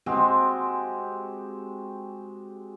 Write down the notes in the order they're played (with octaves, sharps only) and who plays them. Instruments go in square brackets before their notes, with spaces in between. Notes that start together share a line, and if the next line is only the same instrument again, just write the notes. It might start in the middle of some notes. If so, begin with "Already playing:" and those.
[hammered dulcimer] G#3 C4 F#4 G4